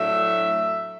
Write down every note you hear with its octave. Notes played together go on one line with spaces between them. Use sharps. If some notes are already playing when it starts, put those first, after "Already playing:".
Already playing: A2 F#3 A3 D4 E5